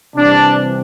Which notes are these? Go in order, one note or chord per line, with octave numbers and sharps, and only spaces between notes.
C3 E3 G3 C4 D4